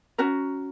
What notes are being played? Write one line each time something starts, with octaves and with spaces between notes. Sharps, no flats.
C#4 F#4 A#4